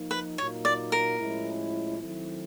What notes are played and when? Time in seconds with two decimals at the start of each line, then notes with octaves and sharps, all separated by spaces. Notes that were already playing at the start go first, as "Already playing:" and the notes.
Already playing: F3 A#3 D#4
0.11 B4
0.38 A#2 F#3 A#3 D#4 C#5
0.65 D5
0.92 A#4
1.19 A2 F3 G#3 C#4 E4
1.99 D#3 F#3 A3 C4 E4